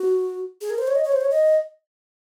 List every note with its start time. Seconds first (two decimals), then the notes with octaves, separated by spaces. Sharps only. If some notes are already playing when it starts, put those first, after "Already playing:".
Already playing: F#4
0.61 G#4
0.70 A#4
0.78 C5
0.87 C#5
0.95 D#5
1.04 C#5
1.12 C5
1.21 C#5
1.31 D#5